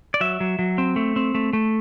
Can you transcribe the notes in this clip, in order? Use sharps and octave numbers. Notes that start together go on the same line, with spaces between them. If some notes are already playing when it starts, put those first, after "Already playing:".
D5
F#3 E5
F#3
F#3
C4
A3
C4
A3
A3